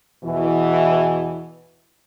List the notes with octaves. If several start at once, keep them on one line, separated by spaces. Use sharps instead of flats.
E2 B2 E3